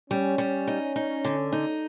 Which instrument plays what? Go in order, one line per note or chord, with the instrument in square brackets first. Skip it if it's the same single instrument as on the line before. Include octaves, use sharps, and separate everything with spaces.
[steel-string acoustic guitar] G3 [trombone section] C#4
[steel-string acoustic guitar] G3
D#4
D#4
D3
D#4